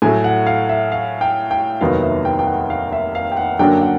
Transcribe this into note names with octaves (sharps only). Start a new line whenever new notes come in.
A2 F#3 A3 G#5
F#5
F5
E5
F5
G5
G5
F1 D#2 D#3 F#3 B3 F5
E5
G5
G5
F#5
F5
E5
F5
G5
F#5
F#2 D3 F#3 A#3 D4 G5
F#5